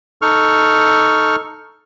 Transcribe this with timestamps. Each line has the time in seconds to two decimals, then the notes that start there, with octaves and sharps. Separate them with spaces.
0.22 D#4 A4 C#6 F6